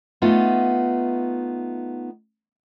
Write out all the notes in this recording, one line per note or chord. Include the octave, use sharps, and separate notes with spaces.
A3 B3 D#4 F4